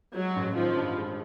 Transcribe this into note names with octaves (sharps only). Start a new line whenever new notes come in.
F#3 G#3
A1
D#3 F3
G2
G#3